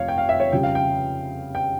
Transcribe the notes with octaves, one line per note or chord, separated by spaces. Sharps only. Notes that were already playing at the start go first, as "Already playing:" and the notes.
Already playing: F1 F2 C#5 F5
G5
F5
E5
C#5
F2 C#3 G3 G5
F5
G5
G5